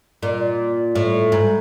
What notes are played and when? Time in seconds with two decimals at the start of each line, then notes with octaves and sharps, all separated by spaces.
0.23 A#2
0.95 A2
1.32 G#2